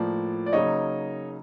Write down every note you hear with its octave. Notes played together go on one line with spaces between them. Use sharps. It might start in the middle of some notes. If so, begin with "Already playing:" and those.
Already playing: A2 F3 A#3 D5
D5
C#3 F#3 A#3 D#4 C#5 D#5